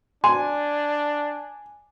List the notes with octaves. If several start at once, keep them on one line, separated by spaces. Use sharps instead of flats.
D4 G#5 C6